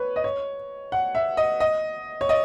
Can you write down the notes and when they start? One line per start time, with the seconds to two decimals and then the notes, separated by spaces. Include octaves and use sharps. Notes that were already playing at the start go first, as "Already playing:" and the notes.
Already playing: B4 C#5
0.16 D#5
0.24 C#5
0.92 F#5
1.15 E5
1.37 D#5
1.60 D#5
2.21 C#5
2.29 D#5